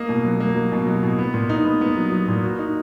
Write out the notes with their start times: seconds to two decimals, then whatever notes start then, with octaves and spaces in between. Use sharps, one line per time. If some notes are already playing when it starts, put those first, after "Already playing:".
Already playing: A#3 D#5
0.09 B2
0.25 F#3
0.40 A#3
0.56 F#3
0.72 B2
0.87 F#3
1.03 B2
1.19 B3
1.34 A#2
1.49 D#4
1.65 B3
1.81 B3
1.97 F#3
2.12 F#3
2.28 A#2
2.44 F#4
2.59 D#4